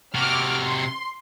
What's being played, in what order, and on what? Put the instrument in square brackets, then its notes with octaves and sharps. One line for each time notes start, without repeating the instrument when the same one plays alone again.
[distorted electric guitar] C3 F#4 [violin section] D6 F6
[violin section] C6